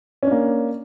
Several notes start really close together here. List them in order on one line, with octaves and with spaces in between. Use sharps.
C#4 D4 A#3